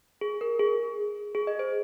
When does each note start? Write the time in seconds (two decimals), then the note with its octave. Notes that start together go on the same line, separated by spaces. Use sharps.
0.21 G#4
0.41 A#4
0.59 G#4
1.35 G#4
1.47 D#5
1.59 C5